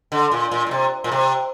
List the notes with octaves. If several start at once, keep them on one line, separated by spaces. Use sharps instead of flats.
D3
A#2
A#2
A#2
C3
A#2
C3